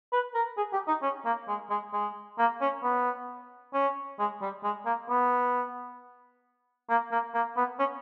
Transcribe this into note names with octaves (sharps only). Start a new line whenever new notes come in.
B4
A#4
G#4
G4
D#4
C#4
A#3
G#3
G#3
G#3
A#3
C#4
B3
C#4
G#3
G3
G#3
A#3
B3
A#3
A#3
A#3
B3
C#4